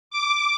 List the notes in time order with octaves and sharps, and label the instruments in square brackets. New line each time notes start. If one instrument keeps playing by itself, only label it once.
[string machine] D6